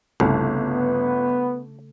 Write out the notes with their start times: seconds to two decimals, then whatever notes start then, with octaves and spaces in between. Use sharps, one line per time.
0.20 G1 C2 C#3 A3 A4
0.60 B3